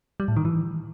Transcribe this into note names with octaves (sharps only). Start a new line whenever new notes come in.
G3
A2
D#3
E3